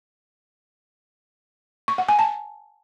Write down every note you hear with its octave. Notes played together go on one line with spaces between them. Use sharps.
C#6
F#5
G#5
A5